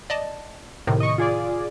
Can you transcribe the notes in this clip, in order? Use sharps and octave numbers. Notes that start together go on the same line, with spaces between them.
D5 D#5 A5
A2 C3 D#3
D#5 C#6
F4 G#4 D5